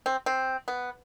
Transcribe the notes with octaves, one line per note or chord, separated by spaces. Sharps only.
C4
C4
B3